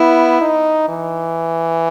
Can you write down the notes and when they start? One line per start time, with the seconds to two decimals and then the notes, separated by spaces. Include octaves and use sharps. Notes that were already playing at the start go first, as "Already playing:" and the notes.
Already playing: B3 E4
0.41 D#4
0.89 E3